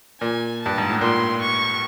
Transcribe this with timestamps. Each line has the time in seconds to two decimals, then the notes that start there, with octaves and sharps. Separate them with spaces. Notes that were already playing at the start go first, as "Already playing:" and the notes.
0.21 A#2 G#5
0.61 G2 A5
0.78 G#2
0.90 A2
1.01 A#2 C6
1.42 C#6